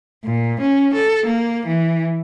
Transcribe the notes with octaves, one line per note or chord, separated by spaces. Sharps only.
A#2
C#4
A4
A#3
E3